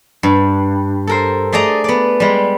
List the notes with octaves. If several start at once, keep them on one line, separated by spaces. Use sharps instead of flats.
G2
A4 A#4 C5
A3 G#4 D5 D#5 A#5
B3 D5
G3 G#3